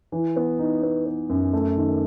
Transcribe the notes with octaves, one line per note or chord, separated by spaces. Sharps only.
E3
B3
D#4
B3
B3
F#2
A3
D#3